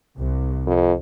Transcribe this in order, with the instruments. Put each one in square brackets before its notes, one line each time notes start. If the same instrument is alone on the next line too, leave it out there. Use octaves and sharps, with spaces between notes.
[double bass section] C2
[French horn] F2